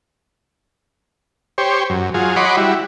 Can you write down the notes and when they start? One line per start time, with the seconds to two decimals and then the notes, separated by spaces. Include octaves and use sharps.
1.58 G4 C5 C#5
1.90 F#2
2.14 F#3 F4 G#4
2.36 C#5 D#5 F#5 B5 C6 D6
2.57 G3 E4 F#4